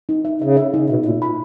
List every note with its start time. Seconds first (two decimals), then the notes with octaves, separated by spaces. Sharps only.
0.09 D#4
0.25 E5
0.42 C#3 E5
0.57 E5
0.74 D#4
0.89 B2 E5
1.06 A#2 E5
1.22 B5